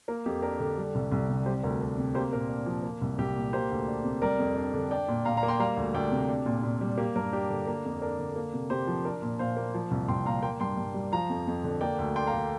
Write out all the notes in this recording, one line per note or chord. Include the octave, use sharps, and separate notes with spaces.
A#3 A#4
F2 G4
D4 A#4
D3
G3
C2
C2
C3
G3 G4 C5
D2 A#4
D4 A#4
C3
A#3 G4 C5
A#2 A#4
D4
F3
A#3
C2
C2 G4
A#2
A#3 G4 C5
D2
D4
C3
G3 A#4 D5
F2
D4
D3
D4 D5 G5
A#2
A#2 F5 A#5
F5 A#5
A#3
G5 C6
G3 F5 A#5
D2
D2 D5 G5
C3
D4
A#2
A#2
G3
A#3 G4
G2 A#4
D4 G4
D3
A#3
F2
D4 A#4
D3
A#3
C3
C3 G4 C5
F3
D4 A#4 D5
A#2
A#2 C5 F5
A#3
F3
C2
C2 G5 C6
A#2 F5 A#5
A#3 G5 C6
G2 G5 C6
G2
G3
F3 F5 A#5
F2
F2
D3
A#3 D5 G5
D2
D4 G5 C6
F5 A#5
D3